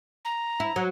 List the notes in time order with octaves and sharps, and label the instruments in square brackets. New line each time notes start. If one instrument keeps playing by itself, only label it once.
[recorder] A#5
[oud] E4
F#3